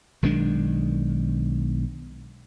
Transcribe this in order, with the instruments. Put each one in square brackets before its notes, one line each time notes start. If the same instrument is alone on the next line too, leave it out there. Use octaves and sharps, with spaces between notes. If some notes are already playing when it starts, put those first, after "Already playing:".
[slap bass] B1 D#3 G#3 D4